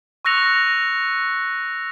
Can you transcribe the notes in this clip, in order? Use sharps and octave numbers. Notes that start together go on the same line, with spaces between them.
C#6 E6 F#6 A#6 C#7 F7